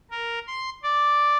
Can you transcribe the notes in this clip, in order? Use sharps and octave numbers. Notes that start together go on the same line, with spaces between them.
A#4
C6
D5